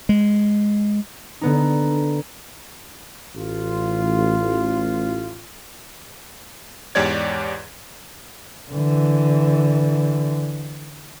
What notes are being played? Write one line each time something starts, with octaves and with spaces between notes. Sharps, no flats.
G#3
D3 B3 D#4
A1 F4
E2 G#2 G4 C#5 D5 G#6
D3 E3